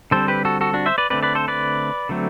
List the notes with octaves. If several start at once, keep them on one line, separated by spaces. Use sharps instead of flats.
D3 G3 C4 A4 C5
G4 B4
F#4 A4
F#4 A4
D4 F#4
C5 E5
B4 D5
D3 A3 C4 B4 D5
B4 D5
A4 C5
B4 D5
D3 F#3 A3 C4